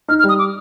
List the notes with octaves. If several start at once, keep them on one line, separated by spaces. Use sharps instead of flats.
D#4 F6
F6
G3
D#6
D6